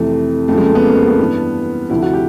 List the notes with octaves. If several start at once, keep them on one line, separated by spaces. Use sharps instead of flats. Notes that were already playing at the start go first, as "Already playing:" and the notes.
Already playing: F2 C3 E3 A3
F2 C#3 F3 A3
G#3
A3
B3
A#3
A#3
B3
G2 E3
D2 C3 F3 E4
F#4
G4